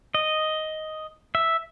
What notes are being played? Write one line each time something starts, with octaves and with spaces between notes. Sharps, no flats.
D#5
E5